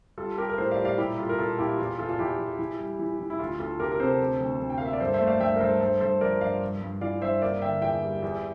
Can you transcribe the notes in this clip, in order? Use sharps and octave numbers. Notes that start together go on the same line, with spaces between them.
G3 F4 A4
G3 G4 A#4
A#4
A2 A4 C5
D5 F5
G3
D5 F5
A#2 E4 G4
G3 F4 A4
A#4
A#2 F4 A4
A#2 E4 G4
E2 F4
E2 F4 A4
F4
E2 E4 G4
E2
E3
G3
E3
E3
E4
D2 F4
D2 F4 A4
D2 G4 A#4
A#4
C3 A4 C5
D2
D2
D2
G5
F5
A#3 E5
D5
G2 A4 C5
C5 E5
A3
D5 F5
G2 E5 G5
A#4
G2 A4 C5
G2 A4 C5
G2 A4 C5
F3 A#4 D5
G2 D5 F5
G2
G2
E3 D5 F5
G2 C5 E5
A#3 D5 F5
D3 E5 G5
E2 E5 G5
G3
E2